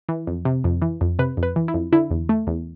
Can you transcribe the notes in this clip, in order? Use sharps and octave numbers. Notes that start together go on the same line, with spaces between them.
E3
F2
C3
F2
E3
F2
C3 B4
F2
B4
E3
E4
F2
D3 E4
E2
A3
E2